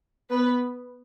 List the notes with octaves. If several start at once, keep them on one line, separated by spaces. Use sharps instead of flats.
B3 B4